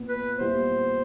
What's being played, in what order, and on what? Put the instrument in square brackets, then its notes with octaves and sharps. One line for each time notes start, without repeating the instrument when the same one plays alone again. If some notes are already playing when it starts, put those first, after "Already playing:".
Already playing: [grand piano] A#2 B3
[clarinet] B4
[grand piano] A#2 G3 B3 E4 [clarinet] C5